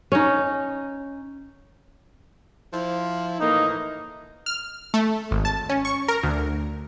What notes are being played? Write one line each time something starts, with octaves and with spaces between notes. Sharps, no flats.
C#4 D#4
F3 E4
A2 E3 A#3 D#4
F6
A3
G#1
A5
C#4
C#6
A#4
D2